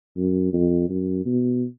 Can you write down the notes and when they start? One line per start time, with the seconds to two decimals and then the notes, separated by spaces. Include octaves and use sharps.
0.17 F#2
0.53 F2
0.90 F#2
1.26 B2